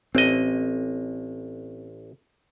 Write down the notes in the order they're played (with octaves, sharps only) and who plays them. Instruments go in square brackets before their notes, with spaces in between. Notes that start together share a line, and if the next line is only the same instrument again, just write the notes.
[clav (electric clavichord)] A1 D#5 [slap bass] C4